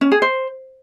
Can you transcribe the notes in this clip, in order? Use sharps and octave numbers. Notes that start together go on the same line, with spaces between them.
C#4
G#4
C5